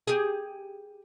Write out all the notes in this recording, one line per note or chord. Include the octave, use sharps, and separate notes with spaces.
G4 G#4